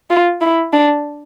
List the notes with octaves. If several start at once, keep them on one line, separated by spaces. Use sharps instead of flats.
F4
E4
D4